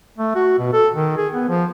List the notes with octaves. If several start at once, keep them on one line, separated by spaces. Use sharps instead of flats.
A3
F#4
B2
A4
D#3
G#4
B3
F3